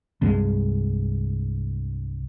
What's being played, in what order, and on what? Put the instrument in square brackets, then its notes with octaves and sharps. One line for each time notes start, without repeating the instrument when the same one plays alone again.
[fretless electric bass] C2 G2 G#3